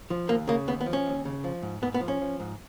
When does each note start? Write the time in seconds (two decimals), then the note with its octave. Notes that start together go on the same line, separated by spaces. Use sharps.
0.10 F3
0.28 D#2 A#3
0.48 C#3 A#3
0.67 D#2 B3
0.81 B3
0.86 F3
0.93 C#4
1.06 D#2
1.25 C#3
1.44 F3
1.63 G#2
1.82 G#2 B3
1.94 B3
2.01 F3
2.08 C#4
2.21 F3
2.40 G#2